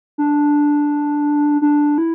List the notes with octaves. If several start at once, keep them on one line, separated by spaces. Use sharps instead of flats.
D4
D4
E4